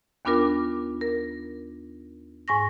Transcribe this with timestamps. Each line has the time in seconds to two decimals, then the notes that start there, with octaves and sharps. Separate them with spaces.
0.25 D#2 B3 D4 F4 A#4 D6
1.01 A#4
2.48 G#2 G#5 C#6 A#6